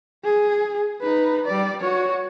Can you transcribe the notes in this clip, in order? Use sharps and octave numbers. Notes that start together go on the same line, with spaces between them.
G#4
D#4 B4
G3 D5
F#4 C#5